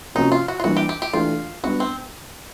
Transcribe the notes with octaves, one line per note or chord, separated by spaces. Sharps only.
C3 F3 A#3 C#4 D#4 F#4
F4
F#4
F4
E3 G3 A#3 D4 F#4
G4
G4
G4
E3 A3 D4 F4 G4
G3 B3 D4 F#4
C4